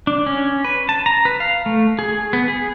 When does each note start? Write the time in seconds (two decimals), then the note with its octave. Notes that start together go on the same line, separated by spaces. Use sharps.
0.07 D4
0.26 C#4
0.65 B4
0.89 A5
1.06 A#5
1.25 B4
1.40 F5
1.66 A3
1.99 G#4
2.33 B3
2.48 G#4